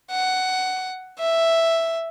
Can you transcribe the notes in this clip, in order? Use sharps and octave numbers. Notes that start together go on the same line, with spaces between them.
F#5
E5